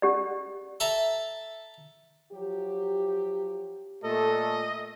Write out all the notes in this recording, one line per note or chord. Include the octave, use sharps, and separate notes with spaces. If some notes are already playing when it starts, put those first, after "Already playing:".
C#4 G4 D5
A4 E5 A#5
F3 F#3 G4
A#2 A3 A4 D#5